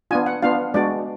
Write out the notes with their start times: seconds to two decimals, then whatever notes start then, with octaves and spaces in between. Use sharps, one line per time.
0.11 B3 D4 F4 G#5
0.26 F#5
0.42 B3 D4 F4 F5
0.74 G#3 B3 D4 F#4 D5